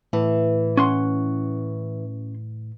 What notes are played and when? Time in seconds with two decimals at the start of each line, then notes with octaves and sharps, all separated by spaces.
0.13 A2 E3
0.77 C#4 F#5 C6